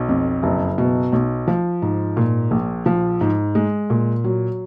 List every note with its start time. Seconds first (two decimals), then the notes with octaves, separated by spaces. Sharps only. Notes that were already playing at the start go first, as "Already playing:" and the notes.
Already playing: B1
0.09 F2
0.43 F#1
0.78 B2
1.13 B1
1.48 F3
1.82 G#2
2.17 A#2
2.51 A#1
2.86 F3
3.21 G#2
3.55 G#3
3.90 A#2
4.24 F#3